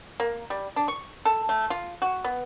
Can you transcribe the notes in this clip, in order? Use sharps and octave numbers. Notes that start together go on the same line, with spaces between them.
A#3
G3
D4
C#6
A4
A3
F4
F#4
B3